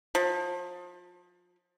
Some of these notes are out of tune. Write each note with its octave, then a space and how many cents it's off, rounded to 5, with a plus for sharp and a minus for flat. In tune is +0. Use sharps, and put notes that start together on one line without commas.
F3 +30